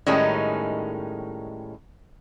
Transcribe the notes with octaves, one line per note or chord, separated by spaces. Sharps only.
A2 D#3 G3 G#3 C#4 D#4